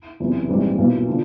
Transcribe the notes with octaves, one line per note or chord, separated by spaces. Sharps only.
F#1 E2 C3 E3
A#1 G#2 E3 G3 C4
B1 A#2 F#3 B3 E4
D3 F3